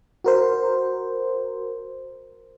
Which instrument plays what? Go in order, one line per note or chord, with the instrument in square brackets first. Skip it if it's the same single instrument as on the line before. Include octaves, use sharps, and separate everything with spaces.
[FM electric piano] F#4 A#4 C5